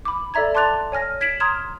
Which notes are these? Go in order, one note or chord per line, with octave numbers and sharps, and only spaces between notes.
B5 D6
A4 D5 E5 A#5 G#6
A5 C6 D6 F#6 A6 F7
C#5 G#5 F6 A#6
G#6 B6 D7 E7 F#7
A#5 C6 D#6 F6 G#6 E7